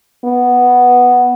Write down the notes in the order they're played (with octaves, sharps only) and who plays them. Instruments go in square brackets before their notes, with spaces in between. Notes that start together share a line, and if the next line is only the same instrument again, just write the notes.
[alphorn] B3